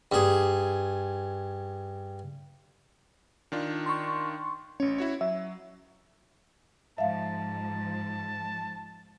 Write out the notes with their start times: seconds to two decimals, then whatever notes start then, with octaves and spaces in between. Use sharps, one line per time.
0.12 G2 G#4
3.52 D#3 D4 F4
3.86 C6 C#6
4.80 A1 C#4 C#5
4.98 E4 F#4 C#5
5.21 F#3 E5
6.98 G#2 F3 E5 F5 A5